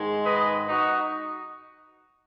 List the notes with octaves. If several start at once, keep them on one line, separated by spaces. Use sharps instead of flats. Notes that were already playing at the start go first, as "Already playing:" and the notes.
Already playing: G#2 D#3 G#3
B4 D#5
D#4 F#4